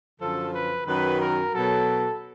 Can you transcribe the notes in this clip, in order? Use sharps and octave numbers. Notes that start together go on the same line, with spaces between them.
F#2 D3 F3 A4
B4
F#2 D#3 F#3 B4
A#4
B2 F#3 A4